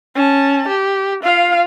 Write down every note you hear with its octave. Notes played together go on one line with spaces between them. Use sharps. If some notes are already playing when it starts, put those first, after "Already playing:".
C#4 A5
G4
F4 F5